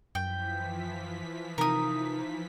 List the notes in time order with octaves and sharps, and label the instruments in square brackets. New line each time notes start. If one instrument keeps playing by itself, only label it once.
[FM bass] F#2 [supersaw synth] E3 F3 B6 [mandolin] G5
[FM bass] C3 [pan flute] D#4 [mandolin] A#4 D#6